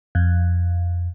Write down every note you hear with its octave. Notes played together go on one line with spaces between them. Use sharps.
F2